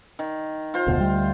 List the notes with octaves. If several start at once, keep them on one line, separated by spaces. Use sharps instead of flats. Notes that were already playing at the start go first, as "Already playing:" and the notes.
D#3
F4 C5
F1 D2 B2
D2 G3